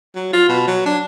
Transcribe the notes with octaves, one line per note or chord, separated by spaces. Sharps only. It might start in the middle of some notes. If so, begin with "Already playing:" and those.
F#3
F4
B2
F#3
D4